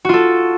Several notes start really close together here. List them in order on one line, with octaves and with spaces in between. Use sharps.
F#4 F4 A4